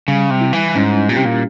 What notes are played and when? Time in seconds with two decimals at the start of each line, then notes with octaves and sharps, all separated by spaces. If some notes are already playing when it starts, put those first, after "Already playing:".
0.08 C#3 G3
0.30 C3
0.41 E4
0.53 E3
0.75 G#2 C#4
1.09 A#2 G4
1.16 C3
1.25 A#2